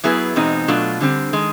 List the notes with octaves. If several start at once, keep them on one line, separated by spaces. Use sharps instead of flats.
F#3 B3 E4 G#4 B4
E2 B2 G#3 C4 D#4
B2 F#3 A3 D4 F4
D3 G3 C4
D#3 G#3